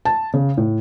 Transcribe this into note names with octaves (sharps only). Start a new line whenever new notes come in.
A5
C#3
A2